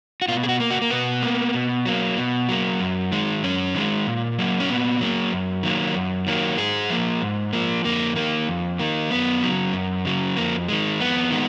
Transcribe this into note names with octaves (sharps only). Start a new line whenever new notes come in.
F#4
B2 F4
G#4
F#4
A#3
F#4
A#3
B2 B3
A#3
B2
F#3 A#3
B2
F#3 A#3
F#2
D#3 G#3
F#2 C#4
D#3 G#3
A#2
F#3 A#3
C#4
A#2 B3
F#3 A#3
F#2
D#3 F#3 A#3
F#2
D#3 F#3 A#3
G#2 G#4
F3 A#3
G#2
F3 A#3
F2 A#3
D#3 A#3
F2
D#3 A#3
F#2 B3
C#3 F#3
F#2
C#3 F#3
F2 A#3
D#3 G#3
F2 B3
D#3 G#3